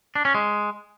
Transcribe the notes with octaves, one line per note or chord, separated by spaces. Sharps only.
D4
C#4
G#3